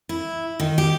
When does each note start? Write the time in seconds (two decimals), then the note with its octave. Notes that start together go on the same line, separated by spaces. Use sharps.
0.09 E4
0.60 D#3
0.78 G4